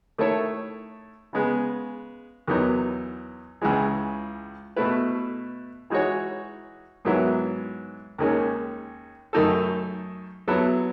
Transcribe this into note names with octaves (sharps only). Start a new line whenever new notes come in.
D#3 A3 E4 A4 C#5
C#3 G#3 B3
E2 D#3 F#3 B3 D#4
C#2 C#3 E3 G#3
B2 A3 E4 B4
E3 G#3 D#4 F#4 C#5
G#2 D#3 F#3 B3 E4
D#2 D#3 G#3 C#4
F#2 D#3 A3 D#4 A4
F#3 B3 E4 A4